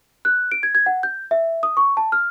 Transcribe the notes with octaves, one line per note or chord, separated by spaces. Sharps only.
F#6
D7
G#6
G#6
F#5
G6
E5
D#6
C#6
A5
F6